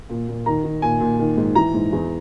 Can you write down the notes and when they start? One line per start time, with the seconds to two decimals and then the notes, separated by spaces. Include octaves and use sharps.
0.10 A#2
0.28 A#2
0.46 D#3 A#5
0.64 D#3
0.82 A#2 G#5
1.00 A#2
1.19 D#3
1.37 G#2
1.55 E3 A#5
1.74 G#2
1.92 E2